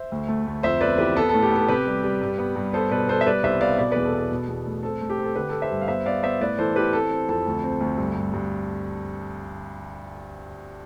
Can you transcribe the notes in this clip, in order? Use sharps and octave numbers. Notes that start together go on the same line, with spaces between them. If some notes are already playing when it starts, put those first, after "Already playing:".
Already playing: C5 E5
D2
A3
D2
F2 C5 E5
B3 B4 D5
E3 G4 B4
B3 A4
A2 A4
G4
B3 A4
C3 G4 B4
G3
G3
G2
B3
G2
B3 A4 C5
B2 B4 D5
B3 A4 C5
E5
G3 B4 D5
C2 C5 E5
B3 D5 F5
B2 B4 D5
E2 B4 D5
A4
B3
A4
B2
E2
A3
C4 A4
A3
G4
C4
A4
D3 G4 B4
D3 A4
C5 E5
G2
F5
B3 C5 E5
B3 D5 F5
B3 C5 E5
A2 B4 D5
E3 A4 C5
E3 G4 B4
C4 A4
C4
F2 A4
D2
C4
D2
G2
G2
G2